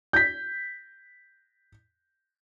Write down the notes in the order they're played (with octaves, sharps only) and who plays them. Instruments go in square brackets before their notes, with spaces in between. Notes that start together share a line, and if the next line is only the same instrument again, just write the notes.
[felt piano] G6 B6